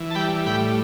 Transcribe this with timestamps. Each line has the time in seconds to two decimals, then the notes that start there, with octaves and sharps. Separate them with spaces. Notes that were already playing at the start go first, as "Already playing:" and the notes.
Already playing: E3
0.11 A5
0.15 G3 G5 B5
0.46 A2 G5 B5